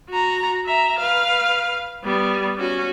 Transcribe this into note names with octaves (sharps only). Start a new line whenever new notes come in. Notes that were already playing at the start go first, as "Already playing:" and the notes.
F#4 A#5
E5 A#5
B4 F5
G3 B3
C#4 F#4